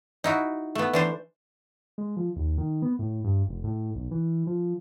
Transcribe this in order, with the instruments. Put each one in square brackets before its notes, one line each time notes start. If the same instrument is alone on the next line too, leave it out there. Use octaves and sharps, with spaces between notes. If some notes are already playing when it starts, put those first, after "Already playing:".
[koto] D#4 E4 F#4
A3 B3
E3 D4 C5
[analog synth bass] G#3
F3
D#2
D#3
B3
A2
G2
F1
A2
B1
E3
F3